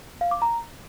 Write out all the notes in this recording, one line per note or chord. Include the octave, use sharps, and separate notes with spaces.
F5
D6
A#5